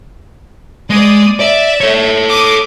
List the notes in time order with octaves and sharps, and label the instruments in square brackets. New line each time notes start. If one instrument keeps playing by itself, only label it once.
[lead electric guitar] G#3 [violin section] D5 D#6
[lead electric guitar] D5 [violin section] E5
[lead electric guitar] A4 C#5
[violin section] D6 D#6